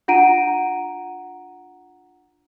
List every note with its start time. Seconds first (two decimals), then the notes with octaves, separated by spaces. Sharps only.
0.08 D4 F4 F#5 A#5 D7 D#7